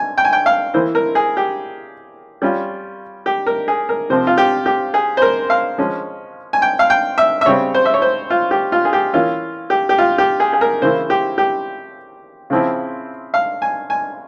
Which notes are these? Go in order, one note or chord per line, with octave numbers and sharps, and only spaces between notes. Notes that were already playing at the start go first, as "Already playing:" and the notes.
Already playing: G#5
G5
G#5
G5
F5
E3 A#3 E4 C5
A#4
G#4
G4
G3 C#4 F4
G4
A#4
G#4
A#4
C3 F3 C4 C5
F4
G4
G4
G#4
C5
A#4
F5
F3 G#3 C#4
G#5
G5
F5
G5
E5
E5
C#3 G3 C4 C#5
C5
E5
C#5
C5
F4
G4
F4
G#4
G4
E3 A#3 C#4 F4
G4
G4
F4
G4
G#4
G#4
A#4
C#3 E3 A#3 E4 C5
G4
G4
C#3 F3 C4 E4
F5
G#5
G#5